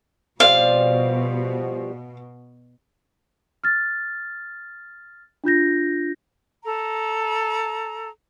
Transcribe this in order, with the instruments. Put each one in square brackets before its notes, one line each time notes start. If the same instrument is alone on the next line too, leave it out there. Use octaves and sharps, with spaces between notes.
[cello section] B2 [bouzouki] F3 G3 C4 [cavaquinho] F5
[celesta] F6 A6
D4 F4 G6 A#6
[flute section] A4 A#5